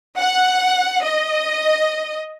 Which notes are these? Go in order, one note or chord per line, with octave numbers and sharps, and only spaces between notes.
F#5
D#5